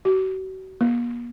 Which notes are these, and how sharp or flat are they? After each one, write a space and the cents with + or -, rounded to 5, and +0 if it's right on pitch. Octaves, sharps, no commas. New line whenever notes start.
F#4 +40
A#3 +45